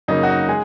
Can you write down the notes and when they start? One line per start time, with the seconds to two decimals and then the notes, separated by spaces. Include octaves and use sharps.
0.08 F#2 C#3 A#3 D#4
0.23 F#4
0.29 D#4
0.49 G#3 G#4